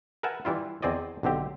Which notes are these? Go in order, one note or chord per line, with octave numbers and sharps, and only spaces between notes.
A#4 B4 E5 F#5 G#5 A5
E3 G3 E4 F4
E2 C4 G#4 D5 D#5
B1 D3 C4 G4